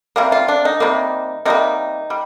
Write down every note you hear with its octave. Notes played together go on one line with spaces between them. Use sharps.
C3 G3 A#3
F4
D4
D#4
C3 G3 A#3
C3 G3 A#3 D#4
G3